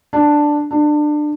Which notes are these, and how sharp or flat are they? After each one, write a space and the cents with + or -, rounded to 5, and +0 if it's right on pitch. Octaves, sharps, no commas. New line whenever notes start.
D4 +5
D4 +25